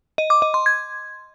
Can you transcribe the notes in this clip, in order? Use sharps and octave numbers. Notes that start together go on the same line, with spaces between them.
D#5
D6
D#5
C6
G#6